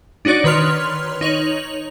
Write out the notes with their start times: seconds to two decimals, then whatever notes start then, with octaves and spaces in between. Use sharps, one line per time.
0.25 D4 D#4 F#4 C#5 D5
0.44 D#3 B4 C#5 C6 F6 F7
1.21 D#4 C#5 F7 F#7